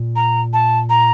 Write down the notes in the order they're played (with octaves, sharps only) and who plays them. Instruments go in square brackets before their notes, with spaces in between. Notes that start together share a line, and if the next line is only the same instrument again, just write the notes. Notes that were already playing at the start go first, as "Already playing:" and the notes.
Already playing: [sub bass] A#2
[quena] A#5
A5
A#5